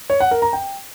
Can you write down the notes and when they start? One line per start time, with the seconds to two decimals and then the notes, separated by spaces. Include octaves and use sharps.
0.10 C#5
0.20 F#5
0.31 A#4
0.42 A#5
0.53 G5